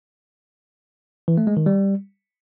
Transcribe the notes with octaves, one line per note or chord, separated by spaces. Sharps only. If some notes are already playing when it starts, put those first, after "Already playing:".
E3
A3
G#3
D#3
G3